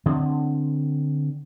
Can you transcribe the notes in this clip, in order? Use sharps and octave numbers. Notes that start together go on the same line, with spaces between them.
D3 C4